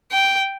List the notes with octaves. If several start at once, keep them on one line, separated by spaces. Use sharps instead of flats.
G5